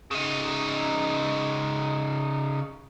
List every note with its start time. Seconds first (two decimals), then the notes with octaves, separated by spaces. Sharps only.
0.11 C#3 D#4